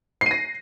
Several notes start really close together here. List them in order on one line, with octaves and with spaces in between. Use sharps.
C7 D#7 A#6